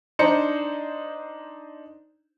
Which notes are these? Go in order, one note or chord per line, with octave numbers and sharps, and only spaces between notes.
D4 D#4 C5 A#5 C#7